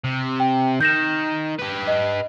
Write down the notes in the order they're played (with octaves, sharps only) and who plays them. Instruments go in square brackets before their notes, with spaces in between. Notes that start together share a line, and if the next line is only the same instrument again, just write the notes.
[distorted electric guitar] C3
[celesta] G5
[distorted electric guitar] D#3 [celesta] G6 A#6 E7
[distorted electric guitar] G4 B4
[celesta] D#5